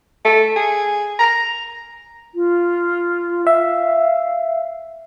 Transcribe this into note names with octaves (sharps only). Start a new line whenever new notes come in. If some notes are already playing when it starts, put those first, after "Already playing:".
A3
G#4
A#5
F4
E5 F5